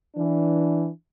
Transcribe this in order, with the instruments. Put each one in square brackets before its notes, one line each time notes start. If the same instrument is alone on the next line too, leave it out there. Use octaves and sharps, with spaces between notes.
[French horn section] E3 D4